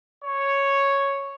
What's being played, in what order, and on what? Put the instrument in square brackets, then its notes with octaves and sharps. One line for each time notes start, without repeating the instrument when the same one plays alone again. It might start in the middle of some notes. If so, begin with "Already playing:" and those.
[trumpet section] C#5